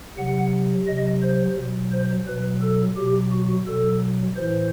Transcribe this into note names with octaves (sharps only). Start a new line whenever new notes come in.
C3 F#3 F#5
C3 F#3 D#5
C5
B2 F#3
C5
B2 F#3 B4
A4
B2 F#3 G4
F#4
B2 F#3 A4
A2 E3 C5